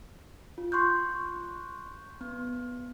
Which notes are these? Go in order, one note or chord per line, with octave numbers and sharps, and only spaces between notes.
F4
C6 C#6 F#6 G6
B3